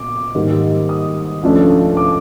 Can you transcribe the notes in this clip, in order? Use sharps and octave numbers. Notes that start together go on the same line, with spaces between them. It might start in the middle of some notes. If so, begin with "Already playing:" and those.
Already playing: A#2 B3 D6
G#2 D#3 G3 A#3
D#6
C#2 C#3 F3 A3 D4
D6